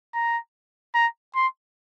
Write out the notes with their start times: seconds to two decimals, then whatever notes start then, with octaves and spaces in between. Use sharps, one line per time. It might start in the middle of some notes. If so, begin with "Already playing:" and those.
0.14 A#5
0.95 A#5
1.35 C6